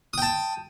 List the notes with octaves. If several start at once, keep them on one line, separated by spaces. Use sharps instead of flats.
G5 A5 D#6